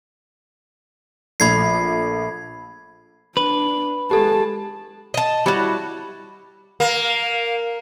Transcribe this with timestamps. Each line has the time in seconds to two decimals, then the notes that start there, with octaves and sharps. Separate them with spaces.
1.40 A#1 F3 A3 B5 G#6 C7
3.37 D4 B4
4.11 G#3 G4 A4 A5
5.14 D#5 A5
5.46 G3 E4 F#4 C#5 A5
6.80 A#3